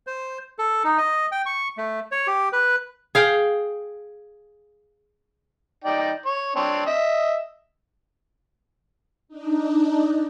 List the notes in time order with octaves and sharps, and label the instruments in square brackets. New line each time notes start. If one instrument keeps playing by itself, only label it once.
[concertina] C5
A4
D#4
D#5
G5
C#6
A3
C#5
G4
B4
[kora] G#4 F5 G5
[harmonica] D#4 D5 G5
C#5
C4 D4 C#5
D#5 E5
[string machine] D4 D#4